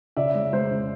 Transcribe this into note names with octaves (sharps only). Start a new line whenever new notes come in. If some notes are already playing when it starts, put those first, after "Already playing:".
C#3 D5 E5
G#3
G#3 C5
C#3